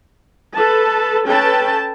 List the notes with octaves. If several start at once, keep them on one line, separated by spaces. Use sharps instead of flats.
A4 B4 A5
C#4 A4 B4 G5 A5